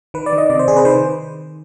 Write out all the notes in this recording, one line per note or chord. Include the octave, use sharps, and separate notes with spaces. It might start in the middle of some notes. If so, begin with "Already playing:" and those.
D#3 B4
D5
D#3
D#5
C3 D5
C5
C3 G#4
B4
D#3 C5